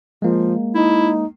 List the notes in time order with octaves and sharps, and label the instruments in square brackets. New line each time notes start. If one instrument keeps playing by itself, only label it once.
[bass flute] F3 [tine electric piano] G#3 A#3
[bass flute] D#4 [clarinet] E4